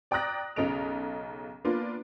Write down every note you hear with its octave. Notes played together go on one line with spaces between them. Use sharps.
D5 G5 A#5 D#6 F#6 A#6
B1 C#3 A4 D#5 D7 F7
A#3 B3 D4 F4 B4